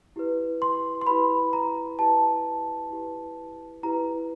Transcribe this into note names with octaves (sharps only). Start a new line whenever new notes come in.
E4 G4 B4
C6
C6
E4 G4 B4 B5
A#5
E4 G4 B4 A5
E4 G4 B4
E4 G4 B4 A#5